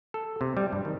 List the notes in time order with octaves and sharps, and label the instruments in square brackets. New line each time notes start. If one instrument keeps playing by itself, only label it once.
[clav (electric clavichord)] A4
C3
G3
G2
D#3